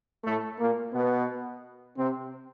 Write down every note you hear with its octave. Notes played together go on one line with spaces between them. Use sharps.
A2 A3
A#2 A#3
B2 B3
C3 C4